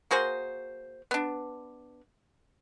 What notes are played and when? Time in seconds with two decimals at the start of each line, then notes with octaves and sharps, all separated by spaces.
0.11 A#3 F#4 G#4 C5
1.11 B3 D4